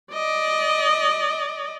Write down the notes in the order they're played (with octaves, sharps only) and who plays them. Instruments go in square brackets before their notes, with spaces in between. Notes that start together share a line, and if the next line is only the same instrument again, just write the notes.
[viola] D5 D#5